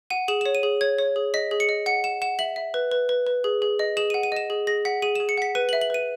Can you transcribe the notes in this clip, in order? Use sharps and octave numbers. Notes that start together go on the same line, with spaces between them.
F#5 D#7
G#4 E7
E7
C#5
D#7
G#4
C#5 G#6
C#5
G#4
D#5 B6
G#4
C#7
D#5
F#5 C#7
F#5 E7
F#5 E7
E5 F#7
E5
B4
B4
B4
B4
G#4
G#4
D#5
G#4 E7
D#7
F#5
D#7
D#5 E7
G#4
G#4 A#6
F#5 B6
G#4 D#7
E7
G#4
C#7
F#5 B6
B4 D#7
F#7
E5
F#7
B4 D#7